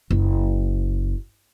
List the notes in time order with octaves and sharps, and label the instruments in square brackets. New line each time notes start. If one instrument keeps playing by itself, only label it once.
[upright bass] F#1